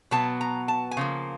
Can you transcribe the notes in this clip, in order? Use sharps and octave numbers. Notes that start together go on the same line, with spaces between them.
B2 F#3 B3 A5
A#5
A5
G#5
C#3 F3 A#3